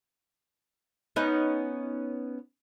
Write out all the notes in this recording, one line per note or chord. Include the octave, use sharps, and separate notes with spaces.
B3 C#4 D#4